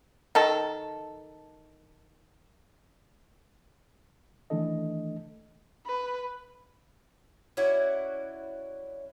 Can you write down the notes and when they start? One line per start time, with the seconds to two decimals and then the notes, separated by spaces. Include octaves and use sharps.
0.35 D#3 A4
4.50 D#3 E3 A3 D4 A4 D#5
5.86 B4
7.57 C#4 E4 F#4 D5